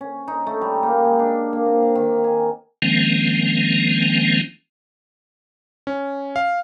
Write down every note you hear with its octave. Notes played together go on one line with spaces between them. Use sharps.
C#4
D#4
A3
G3
A#3
G#3
D4
A#3
C4
F5
D#3
G#5
D#3 F3 G#3 A#3 C4 C#4
C#4
F5